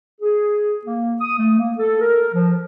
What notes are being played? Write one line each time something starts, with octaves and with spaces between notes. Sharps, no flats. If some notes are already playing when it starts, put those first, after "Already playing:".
G#4
A#3
D#6
A3
A#3
A4
A#4
F3